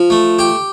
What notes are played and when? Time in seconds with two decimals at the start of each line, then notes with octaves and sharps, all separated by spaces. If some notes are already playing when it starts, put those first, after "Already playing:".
Already playing: F3
0.10 A3
0.39 G4